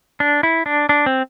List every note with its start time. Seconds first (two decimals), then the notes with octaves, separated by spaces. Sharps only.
0.20 D4
0.43 E4
0.66 D4
0.89 D4
1.06 C4